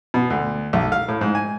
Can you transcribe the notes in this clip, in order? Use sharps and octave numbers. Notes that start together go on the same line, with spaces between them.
B2
D2
B1
F5
A2
G#2
G#5